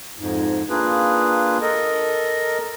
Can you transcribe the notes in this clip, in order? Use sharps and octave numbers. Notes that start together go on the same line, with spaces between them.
F2 G#2
A#3 D4 F4 G#4 B4
A4 A#4 D#5